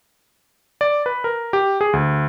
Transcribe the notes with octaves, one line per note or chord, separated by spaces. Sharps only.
D5
B4
A#4
G4
G#4
D2